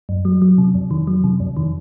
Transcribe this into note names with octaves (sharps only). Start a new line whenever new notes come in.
F#2
F#3
F#3
C3
F2
D#3
F#3
C3
F2
D#3